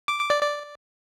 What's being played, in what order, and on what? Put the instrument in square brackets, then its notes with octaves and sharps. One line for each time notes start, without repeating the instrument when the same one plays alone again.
[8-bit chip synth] D6
D6
D5
D5